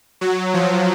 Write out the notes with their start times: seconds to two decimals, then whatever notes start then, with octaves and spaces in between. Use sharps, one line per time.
0.21 F#3
0.54 F3